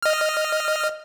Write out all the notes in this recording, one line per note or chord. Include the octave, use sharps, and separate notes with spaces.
D#5 F6